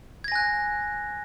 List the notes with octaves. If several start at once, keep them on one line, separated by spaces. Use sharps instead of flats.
G#5 F#6 G#6 A#6